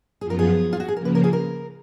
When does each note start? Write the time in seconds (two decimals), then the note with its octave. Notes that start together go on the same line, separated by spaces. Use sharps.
0.21 F#2 F3 B3 F4 G#4
0.30 A#4
0.39 G#4
0.73 F4
0.80 F#4
0.88 G#4
0.96 C#3 F3 A#3 A#4
1.05 B4
1.15 A#4
1.24 G#4
1.33 A#4